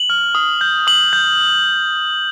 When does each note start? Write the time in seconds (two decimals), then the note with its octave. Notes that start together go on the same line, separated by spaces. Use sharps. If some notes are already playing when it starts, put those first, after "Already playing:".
Already playing: F#7
0.10 F6
0.35 D#6
0.61 G6
0.87 D#6 F#7
1.13 G6